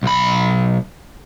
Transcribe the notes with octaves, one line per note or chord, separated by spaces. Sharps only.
B1 B5